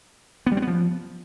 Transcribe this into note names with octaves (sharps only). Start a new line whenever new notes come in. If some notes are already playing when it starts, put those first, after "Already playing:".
B3
G3
C4
B3
F3